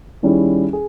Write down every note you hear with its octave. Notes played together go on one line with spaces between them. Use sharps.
D#3 G3 C#4 E4 G#4
G#4